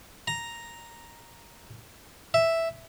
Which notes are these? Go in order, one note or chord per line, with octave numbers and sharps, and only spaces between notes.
A#5
E5